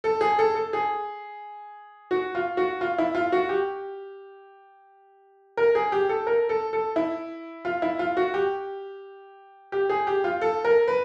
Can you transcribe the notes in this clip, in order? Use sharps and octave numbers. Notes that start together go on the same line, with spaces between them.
A4
G#4
A4
A4
G#4
F#4
F4
F#4
F4
E4
F4
F#4
G4
A#4
G#4
G4
A4
A#4
A4
A4
E4
F4
E4
F4
F#4
G4
G4
G#4
G4
F4
A4
A#4
B4